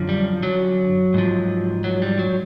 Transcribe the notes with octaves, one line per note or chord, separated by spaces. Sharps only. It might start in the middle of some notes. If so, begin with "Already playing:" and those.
Already playing: F#2 D3 F3
G3
F#3
G#2 F3
F#3
G3
F#3